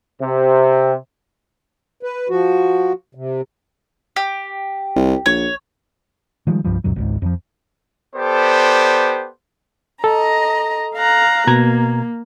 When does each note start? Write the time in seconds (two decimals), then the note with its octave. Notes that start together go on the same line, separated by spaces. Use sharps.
0.21 C3
2.03 B4
2.29 F3 F#4
3.15 C3
4.16 G4
4.96 C2
5.26 A#1 C#5
6.47 D#3 F3 G3 G#3
6.64 C2 G2 F3 G3
6.84 C#2 F#2 B2 F#3
6.96 G#1 C#2 G#2
7.22 F2 F3
8.15 B3 G4 A4 C5 D5
10.04 A4 D#5 A#5
10.96 F5 A#5 F#6
11.47 B2 A#3 A#5 G#6